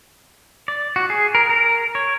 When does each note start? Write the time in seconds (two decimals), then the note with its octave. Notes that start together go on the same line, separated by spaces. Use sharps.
0.68 D5
0.96 F#4
1.10 G#4
1.35 A#4
1.49 A#4
1.95 C#5